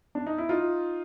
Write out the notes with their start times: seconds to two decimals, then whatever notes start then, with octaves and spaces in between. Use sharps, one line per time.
0.15 D4
0.26 D#4
0.38 E4
0.49 D#4 F4